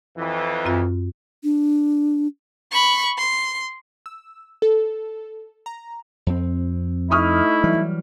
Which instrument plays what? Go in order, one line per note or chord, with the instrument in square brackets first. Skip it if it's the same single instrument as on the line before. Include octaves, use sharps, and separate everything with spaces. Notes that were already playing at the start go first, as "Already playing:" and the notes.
[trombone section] F2 E3
[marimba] F#2 C4 F4
[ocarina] D4
[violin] B5 C#6
C6
[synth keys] E6
A4
A#5
[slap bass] F2 C4
[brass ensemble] A3 D#4 E4 [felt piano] C#6 D#6 F6
[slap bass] E3 F#3 G3